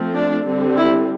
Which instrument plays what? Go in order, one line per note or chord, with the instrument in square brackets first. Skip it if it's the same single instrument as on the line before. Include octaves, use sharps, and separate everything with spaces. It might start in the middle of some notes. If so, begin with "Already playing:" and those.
Already playing: [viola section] F3 A3 C4
D4
D3 G3 C4
E4